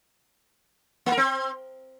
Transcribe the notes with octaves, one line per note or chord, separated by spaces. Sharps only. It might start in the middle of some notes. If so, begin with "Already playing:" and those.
A#3
A#4
C4